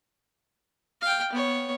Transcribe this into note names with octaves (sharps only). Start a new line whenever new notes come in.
F5 G5
B3 C#5